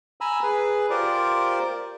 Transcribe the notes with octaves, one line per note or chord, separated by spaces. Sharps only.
G#5 A#5 B5 E6
G#4 B4
F4 G4 A#4 C5 D5